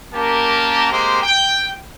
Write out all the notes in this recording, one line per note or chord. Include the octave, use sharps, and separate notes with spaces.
A#3 C#4 G4 A#4 A5
G#3 A#3 C4 G4 C5
G5